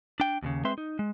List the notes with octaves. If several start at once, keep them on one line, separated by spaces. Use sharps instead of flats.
D4 G5
D#2 A#2 C#3
G#3 C4 B4 E5 C6
D#4
G#3